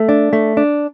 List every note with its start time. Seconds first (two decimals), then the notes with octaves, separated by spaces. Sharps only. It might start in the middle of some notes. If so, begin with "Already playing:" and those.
Already playing: A3
0.09 D4
0.33 A3
0.57 D4